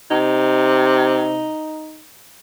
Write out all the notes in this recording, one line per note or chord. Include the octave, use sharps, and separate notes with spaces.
C3 D#4